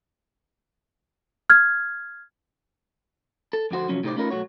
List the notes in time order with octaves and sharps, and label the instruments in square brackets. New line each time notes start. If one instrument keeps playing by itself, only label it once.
[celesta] F6 G#6
[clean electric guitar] A4
F2 D3 F#4 C5
C3 F3 F#3 C#4
A2 C3 D#4 G4 C5 D5
A3 C#4 D#4 F4 A#4 B4
B1 G#2 A3 F#4 C#5